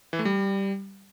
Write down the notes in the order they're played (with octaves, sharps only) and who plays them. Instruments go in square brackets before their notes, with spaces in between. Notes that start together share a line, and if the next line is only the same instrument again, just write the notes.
[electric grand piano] E3
A3
G3